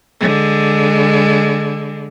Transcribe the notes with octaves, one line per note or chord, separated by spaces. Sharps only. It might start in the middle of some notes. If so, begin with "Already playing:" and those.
D3 G#3